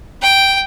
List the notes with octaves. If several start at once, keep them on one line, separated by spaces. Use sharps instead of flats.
G5